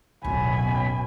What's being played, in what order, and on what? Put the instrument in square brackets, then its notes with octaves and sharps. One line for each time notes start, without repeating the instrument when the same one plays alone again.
[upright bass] D1 D#4 [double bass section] B1 F#2 B2 [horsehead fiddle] G#5 [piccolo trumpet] B5